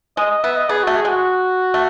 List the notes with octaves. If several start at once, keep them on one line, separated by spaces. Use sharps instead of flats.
G#3 D#5
D#5
B3 E5
D#5
B3 G#4
A3 F#4
G#4
G#3 F#4
A3